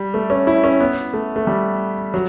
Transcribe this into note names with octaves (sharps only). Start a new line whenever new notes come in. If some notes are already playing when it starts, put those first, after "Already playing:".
Already playing: G3
A3
C#4
E4
C#4
B3
A3
A3
G3
F#3